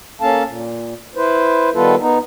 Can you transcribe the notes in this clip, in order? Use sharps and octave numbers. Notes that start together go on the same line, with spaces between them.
A#3 C#4 A4 F5 A5
A#2
E4 B4 C5
D#3 G3 B3 F4 A4 B4
B3 D#4